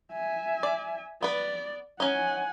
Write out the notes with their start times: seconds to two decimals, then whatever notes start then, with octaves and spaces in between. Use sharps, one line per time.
0.12 E5 G#5
0.63 D5
1.22 B3 B4 D5
2.00 C#4 D#4 F#5 G#5